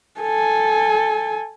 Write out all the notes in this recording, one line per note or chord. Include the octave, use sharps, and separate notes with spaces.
A4 G#5